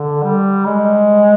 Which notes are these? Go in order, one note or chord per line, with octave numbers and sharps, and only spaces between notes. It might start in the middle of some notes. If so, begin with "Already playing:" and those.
Already playing: D3
G3
G#3